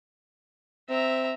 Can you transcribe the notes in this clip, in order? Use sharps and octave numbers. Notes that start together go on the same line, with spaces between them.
C4 E5 A#5